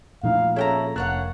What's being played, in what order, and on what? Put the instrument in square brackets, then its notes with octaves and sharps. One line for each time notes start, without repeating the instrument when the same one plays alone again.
[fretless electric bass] A#2 F3 [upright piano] A3 D#4 E4 [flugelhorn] F5
[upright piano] C#4 G#4 C#5 [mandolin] E4 G5 A#5 [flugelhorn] A4
[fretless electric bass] F1 [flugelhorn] A#3 [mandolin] D4 C#5 F#5 [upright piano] F#6